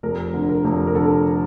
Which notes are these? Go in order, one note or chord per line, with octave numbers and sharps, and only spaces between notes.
F1 A#4
D3
A#4
F1
A#4
D3 A4